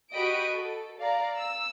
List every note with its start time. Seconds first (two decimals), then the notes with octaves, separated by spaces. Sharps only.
0.13 F#4 G4 D#5 B5 D#6 D7
0.51 A4
0.99 D5 F5 A#5
1.37 E6